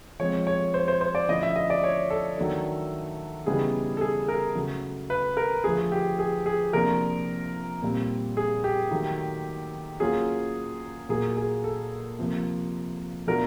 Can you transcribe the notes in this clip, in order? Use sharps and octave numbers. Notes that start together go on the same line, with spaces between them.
F3 G#3 C4 C#5
C#5
C5
C5
C5
D5
D3 F3 A3 C#4 E4 D#5
E5
D#5
D5
C#5
A4
D#3 F#3 A3 D4
C#3 E3 G3 B3 D#4 G#4
A4
G#4
A#4
C#3 F#3 A3
B4
A#4
D3 F3 A3 G#4
G4
G#4
G#4
C3 F3 A#3 D4 F4 A#4
A#2 G3 C4
G#4
G4
D#3 F#3 A3
F#3 A#3 C#4 F4 G#4
A#2 F#3 A#3 G#4
G#4
A4
C3 F3 A#3
B2 F#3 A3 D4 F4 A#4